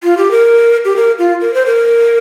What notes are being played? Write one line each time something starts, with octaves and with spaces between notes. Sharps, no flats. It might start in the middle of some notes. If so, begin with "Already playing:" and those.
F4
G4
A#4
G4
A#4
F4
A#4
C5
A#4